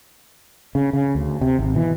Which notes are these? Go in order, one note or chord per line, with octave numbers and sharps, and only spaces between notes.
C#3
C#3
D2
C3
G#1
B2 E3